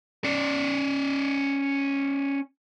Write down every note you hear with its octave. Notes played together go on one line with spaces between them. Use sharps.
C#4 D5